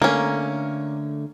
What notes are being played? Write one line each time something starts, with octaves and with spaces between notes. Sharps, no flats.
D3 A3 A#3 C#4